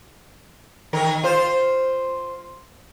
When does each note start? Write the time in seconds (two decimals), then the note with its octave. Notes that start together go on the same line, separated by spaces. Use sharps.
0.93 D#3 A#4
1.23 F4 C5